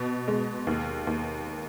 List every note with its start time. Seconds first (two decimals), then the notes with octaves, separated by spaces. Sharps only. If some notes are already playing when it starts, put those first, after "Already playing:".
Already playing: B2
0.28 G#3
0.67 D#2
1.07 D#2